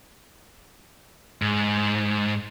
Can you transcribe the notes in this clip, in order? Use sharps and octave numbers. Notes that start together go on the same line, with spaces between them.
G#2